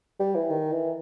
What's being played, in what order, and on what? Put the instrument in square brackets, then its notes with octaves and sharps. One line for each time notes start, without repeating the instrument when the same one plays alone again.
[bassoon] G3
E3
D#3
E3